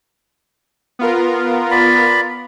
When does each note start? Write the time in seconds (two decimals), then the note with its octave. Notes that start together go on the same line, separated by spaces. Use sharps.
0.99 B3 F4 A#4
1.71 D5 B5